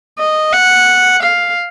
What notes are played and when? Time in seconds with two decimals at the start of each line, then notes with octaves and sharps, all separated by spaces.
0.19 D#5
0.53 F#5
1.23 F5